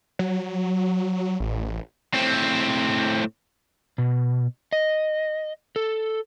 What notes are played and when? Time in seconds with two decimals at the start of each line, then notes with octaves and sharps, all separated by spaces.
0.19 F#3
1.40 A1
2.14 A2 C4
3.98 B2
4.73 D#5
5.76 A4